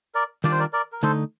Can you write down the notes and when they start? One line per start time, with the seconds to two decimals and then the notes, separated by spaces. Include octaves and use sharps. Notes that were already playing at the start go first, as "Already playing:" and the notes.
0.15 A#4 D5
0.44 D#3 G3 D4 F4 D5
0.52 C5
0.59 A#4 D5
0.73 A#4 D5
0.92 A#4
1.03 D3 A3 D#4 A4 C5